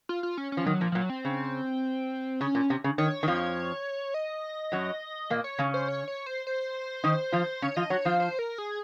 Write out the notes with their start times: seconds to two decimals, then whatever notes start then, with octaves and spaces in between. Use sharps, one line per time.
0.09 F4
0.23 F4
0.38 C#4
0.52 C#4
0.57 F3
0.66 D#3 F#3
0.81 A#2 F3
0.92 F3
0.95 A#2 F#3
1.10 C4
1.25 C#3
2.41 C#3 C#4
2.55 A#2
2.70 C3
2.84 C#3
2.98 D#3 C#5
3.23 D#3
3.28 F2 F3
4.14 D#5
4.72 F#2 F#3
5.30 A#2 A#3
5.44 C#5
5.59 C#3 C#4
5.74 C5
5.88 C#5
6.08 C#5
6.26 C5
6.47 C5
7.04 D#3 D#4
7.32 F3 F4
7.62 C#3 C#4 C#5
7.76 F3 F4 D#5
7.90 F#3 F#4 C#5
8.05 F3 F4 C5
8.20 C5
8.39 A#4
8.58 G#4